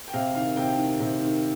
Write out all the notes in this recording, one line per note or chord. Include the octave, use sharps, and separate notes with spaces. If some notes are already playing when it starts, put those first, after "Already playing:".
G5
C3 F5
D#3 F5
C3 G5
D#3
C3
D#3